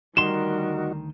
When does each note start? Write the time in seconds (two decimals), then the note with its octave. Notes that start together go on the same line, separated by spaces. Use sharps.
0.17 D2 D#3 G3 D#4 F#4 A#4 C6 E7